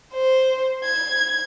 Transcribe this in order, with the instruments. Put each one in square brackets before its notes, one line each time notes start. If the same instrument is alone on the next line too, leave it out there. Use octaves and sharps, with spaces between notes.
[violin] C5
G#6